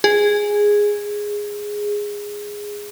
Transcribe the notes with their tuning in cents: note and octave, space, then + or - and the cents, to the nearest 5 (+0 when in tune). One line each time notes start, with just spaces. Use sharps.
G#4 -5